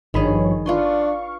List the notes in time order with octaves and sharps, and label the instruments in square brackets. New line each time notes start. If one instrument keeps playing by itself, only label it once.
[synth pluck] G#1 A#4 B5 [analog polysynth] G2 F3 C#5 [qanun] D#3 G#4
[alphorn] D4 [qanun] F4 B4 C6 [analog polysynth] F5 C#6